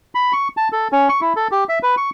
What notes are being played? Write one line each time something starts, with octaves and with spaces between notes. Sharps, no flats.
B5
C#6
A5
A4
C#4
C#6
E4
A4
G4
E5
B4
C#6